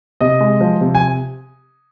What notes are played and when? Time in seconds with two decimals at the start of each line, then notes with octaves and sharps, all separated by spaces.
0.21 C3 D#5
0.40 G#3
0.61 F3
0.81 C3
0.95 G#5